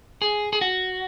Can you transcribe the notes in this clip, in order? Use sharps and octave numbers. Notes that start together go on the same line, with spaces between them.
G#4
G#4
F#4